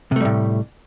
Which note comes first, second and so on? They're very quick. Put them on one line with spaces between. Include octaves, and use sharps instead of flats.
C3 A3 G3 A2